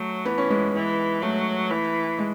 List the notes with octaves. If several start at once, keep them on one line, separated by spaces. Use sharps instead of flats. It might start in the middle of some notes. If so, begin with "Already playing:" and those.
Already playing: F#3 A3
E3 B3
C#4
G#3 B3
E3
F#3 A3
E3
G#3